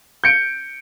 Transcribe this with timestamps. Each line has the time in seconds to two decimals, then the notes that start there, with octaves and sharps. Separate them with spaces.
0.24 G6 C#7 D7